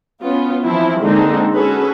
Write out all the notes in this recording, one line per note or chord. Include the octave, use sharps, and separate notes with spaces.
B3 C#4 F4
E3 F3 C4 E4
D3 G#3 A#3 C4 D4 D#4
C#4 F#4 G#4 A4 B4